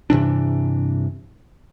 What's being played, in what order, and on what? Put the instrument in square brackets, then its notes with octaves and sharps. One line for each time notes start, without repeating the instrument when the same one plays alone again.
[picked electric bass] G2 C3 E3 D4